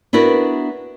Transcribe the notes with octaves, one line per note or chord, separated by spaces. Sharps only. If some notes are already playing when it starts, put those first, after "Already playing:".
B3 D4 E4 F#4 A#4 B4